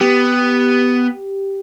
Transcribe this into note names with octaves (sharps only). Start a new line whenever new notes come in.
B3 G4